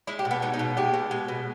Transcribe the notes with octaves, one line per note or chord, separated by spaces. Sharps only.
G#3 E4
G4
B2
B3
G#3 D#4
D#4
B2
G#3 G4
B2
G#3
B2